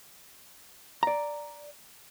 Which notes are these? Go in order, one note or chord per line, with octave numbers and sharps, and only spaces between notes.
D5 A#5